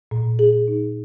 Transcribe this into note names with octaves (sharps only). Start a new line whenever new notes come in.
A#2
G#4
D#4